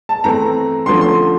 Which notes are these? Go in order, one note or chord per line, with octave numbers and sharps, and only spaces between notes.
A5
E3 A3 C4 A#5
D3 F3 A3 C#4 C6
C6